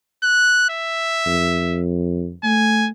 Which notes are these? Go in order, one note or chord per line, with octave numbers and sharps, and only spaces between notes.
F#6
E5
F2
A3 G#5